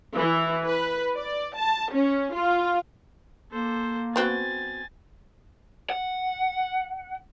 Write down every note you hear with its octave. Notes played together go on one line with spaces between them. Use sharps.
E3
B4
D5
A5
C#4
F4
A#3 A4 C5
B3 C4 F#4 G#5 A6
F#5